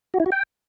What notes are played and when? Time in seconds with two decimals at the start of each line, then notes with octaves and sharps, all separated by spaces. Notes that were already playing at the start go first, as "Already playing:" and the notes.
0.14 F#4
0.20 E4
0.26 F#4
0.32 G5